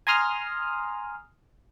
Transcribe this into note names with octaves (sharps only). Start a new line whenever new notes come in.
G#5 A#5 C6 D#6 F6